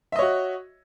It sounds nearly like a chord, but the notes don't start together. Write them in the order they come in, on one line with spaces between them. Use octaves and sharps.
E5 D#5 C#5 F#4